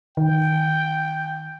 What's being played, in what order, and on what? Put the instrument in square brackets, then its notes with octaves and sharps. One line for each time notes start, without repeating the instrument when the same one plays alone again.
[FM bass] D#3 [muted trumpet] G5